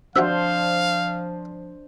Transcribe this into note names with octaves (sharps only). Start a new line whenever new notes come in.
F3 D4 F4 F#4 C5 E5 F5